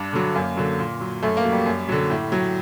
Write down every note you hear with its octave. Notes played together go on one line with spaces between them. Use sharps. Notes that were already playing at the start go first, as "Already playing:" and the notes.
Already playing: G2 D4
D3 F#3
F#2 A#3
D3 F#3
A#2
F#3
F#2 A3
A#3
F#3
G3
F#2
D3 F#3
A2
F#3